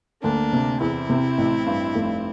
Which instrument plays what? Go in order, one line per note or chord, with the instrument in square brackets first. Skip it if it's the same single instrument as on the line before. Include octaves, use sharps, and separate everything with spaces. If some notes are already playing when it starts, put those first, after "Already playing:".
[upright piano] D2 [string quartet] A#3 D4
[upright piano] C3
[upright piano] E2 [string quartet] C4 E4
[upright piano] C3
A1
G2
F1